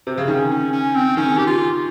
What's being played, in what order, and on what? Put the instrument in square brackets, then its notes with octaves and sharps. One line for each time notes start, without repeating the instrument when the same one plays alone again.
[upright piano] C3
C#3
[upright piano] D#3 [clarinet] C#4
[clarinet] C#4
C#4
C4
[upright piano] D#3 [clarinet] C#4
[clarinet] G4
F4